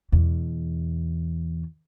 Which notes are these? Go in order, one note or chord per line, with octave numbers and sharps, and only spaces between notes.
E2 B2